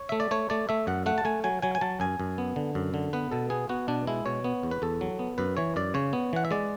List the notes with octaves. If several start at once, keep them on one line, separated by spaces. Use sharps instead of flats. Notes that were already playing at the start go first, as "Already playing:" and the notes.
Already playing: C#5
A3 E5
D5
A3 C#5
A3 D5
A3 E5
F#2 F#5
A3 F#5
A5
A3 G#5
F#3 G#5
F#3 G#5
G#5
F#3 A5
F#2 G#5
F#2
B3
D3
F#2
D3
B3 B4
B2 A4
B3 G#4
B3 F#4
B2 D4
G#3 E4
B2 C#5
B3
E2
B4
E2 A4
F#3
B3
F#2 B4
E3 C#5
F#2 D5
C#3 C#5
B3
E3 F#5
E5
G#3 D5